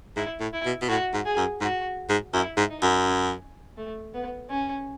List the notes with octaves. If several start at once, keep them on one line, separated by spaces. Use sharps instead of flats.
G#2 E4
A2
E4
B2
B2
A2 F#4
G#2
G#4
F#2
G#2 F#4
G#2
F#2 E4
G#2
D#4
F#2
C#4
A3
B3
C#4